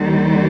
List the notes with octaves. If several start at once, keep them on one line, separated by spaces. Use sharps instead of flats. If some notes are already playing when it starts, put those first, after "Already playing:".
Already playing: D#2 D#3 G3